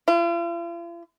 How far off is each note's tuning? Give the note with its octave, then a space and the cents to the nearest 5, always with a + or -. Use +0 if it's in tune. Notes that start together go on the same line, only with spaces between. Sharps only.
F4 -45